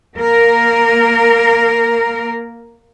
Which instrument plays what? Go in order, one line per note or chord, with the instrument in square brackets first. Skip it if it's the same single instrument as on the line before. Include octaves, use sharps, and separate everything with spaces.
[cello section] A#3 A#4